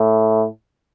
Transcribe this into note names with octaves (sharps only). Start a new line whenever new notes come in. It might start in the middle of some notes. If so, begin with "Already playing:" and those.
Already playing: A2